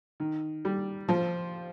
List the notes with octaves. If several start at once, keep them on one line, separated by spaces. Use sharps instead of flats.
D#3
G3
F3